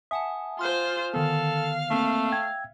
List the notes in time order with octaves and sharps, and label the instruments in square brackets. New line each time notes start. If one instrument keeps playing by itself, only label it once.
[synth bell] E5 F#5 A5 [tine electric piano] G#5 D#6
[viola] F4 C5 [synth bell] C6 F6
[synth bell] D3 D#3 B3 [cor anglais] A4 [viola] F5
[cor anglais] A3 [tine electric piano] A#3 C4 [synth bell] E5
[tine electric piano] G5 E6 G#6